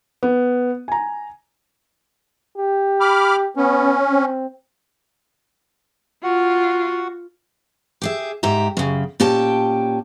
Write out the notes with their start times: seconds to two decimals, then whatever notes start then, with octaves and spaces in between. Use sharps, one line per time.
0.23 B3
0.88 G#5 A#5
2.57 G4
3.01 B5 D6 F6
3.57 B3 C#4
4.11 C4
6.24 F4 F#4 F#5
8.02 G4 G#4 E5
8.43 G#2 G4 E5 A#5
8.77 F#2 C#3
9.20 A#2 C#4 G4 G5 A5